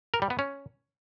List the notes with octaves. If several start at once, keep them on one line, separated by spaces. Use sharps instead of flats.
A#4
G3
B3
C#4